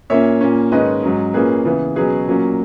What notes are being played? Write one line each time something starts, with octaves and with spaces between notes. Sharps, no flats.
A#2 A#3 C#4 C#5 E5
A#2 A#3 C#4
G#2 D#3 G#3 C#4 B4 D#5
G#2 F#3 C#4
A#2 A#3 C#4 G#4 B4
C#3 E3 B3
B2 F#3 C#4 G#4 B4
A#2 F#3 A#3 C#4